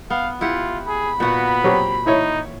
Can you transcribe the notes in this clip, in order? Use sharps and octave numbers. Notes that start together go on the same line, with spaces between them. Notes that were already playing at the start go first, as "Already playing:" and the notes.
B3 F5
E4 F4 G4 F#5
G#4 B5
A#2 B3 F#4 F#5
F#3 C4 G4
E3 D#4 E4 C#5